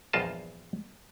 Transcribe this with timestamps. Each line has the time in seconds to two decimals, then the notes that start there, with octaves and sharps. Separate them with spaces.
0.13 A#1 E2 G2 F4 D#5 A5